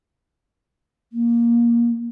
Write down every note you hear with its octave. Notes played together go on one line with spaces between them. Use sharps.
A#3